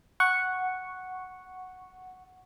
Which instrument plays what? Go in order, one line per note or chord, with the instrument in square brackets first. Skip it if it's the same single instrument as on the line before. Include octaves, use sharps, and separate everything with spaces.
[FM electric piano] F#5 C#6